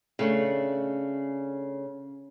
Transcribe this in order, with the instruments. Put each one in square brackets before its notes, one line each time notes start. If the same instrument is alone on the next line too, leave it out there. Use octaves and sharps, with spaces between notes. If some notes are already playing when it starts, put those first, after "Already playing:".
[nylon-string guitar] C#3 A3 D4